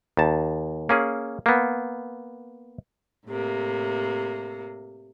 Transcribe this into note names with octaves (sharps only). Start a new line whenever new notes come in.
D#2 A5
A#3 C#4 G#4
A#3 B3
A2 C3 A#3